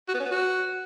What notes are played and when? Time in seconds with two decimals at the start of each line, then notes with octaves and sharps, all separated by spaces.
0.08 F#4
0.14 B3
0.20 C#4
0.26 B3
0.31 F#4